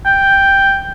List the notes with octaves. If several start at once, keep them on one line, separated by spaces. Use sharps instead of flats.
G5